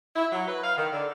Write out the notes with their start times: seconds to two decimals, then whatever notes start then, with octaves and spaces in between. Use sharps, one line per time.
0.16 E4
0.32 F#3
0.48 B4
0.64 F5
0.78 D#3
0.92 D3